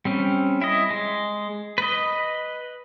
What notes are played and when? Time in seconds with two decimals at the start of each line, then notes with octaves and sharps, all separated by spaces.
0.05 G3 C4 C#4
0.62 E4 D#5
0.91 G#3
1.78 B4 D#5